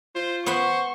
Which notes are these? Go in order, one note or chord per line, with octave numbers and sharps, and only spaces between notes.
F4 C5
B3 C5 F#5 B5 C#6